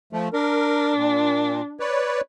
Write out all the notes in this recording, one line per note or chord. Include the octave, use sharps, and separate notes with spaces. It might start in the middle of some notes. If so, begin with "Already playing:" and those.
F3 A3
D4 A#4
A#2
B4 C#5 D5